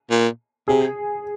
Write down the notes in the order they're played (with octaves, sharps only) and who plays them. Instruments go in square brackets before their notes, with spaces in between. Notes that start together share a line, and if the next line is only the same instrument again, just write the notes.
[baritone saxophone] A#2
[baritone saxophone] C3 [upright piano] G#4